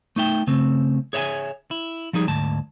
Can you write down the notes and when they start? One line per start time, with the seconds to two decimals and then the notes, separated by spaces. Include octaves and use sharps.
0.16 A3 D#4 E5 G5
0.47 C#3 A3 C4
1.13 G#4 C#5 E5 F#5 G#5
1.71 E4
2.13 F3 G3 D#4 G#4
2.27 D2 G#2 A5